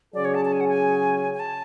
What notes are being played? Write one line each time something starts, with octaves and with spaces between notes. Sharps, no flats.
C#3 F#3 C#4 G#4 D5
C#5
A5
A5
G#5
F#5
G#5
G#5
A5